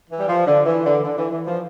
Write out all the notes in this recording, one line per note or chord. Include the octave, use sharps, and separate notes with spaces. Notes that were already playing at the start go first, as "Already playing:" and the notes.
E3
G3
F3
D3
E3
D3
D3
E3
E3
F3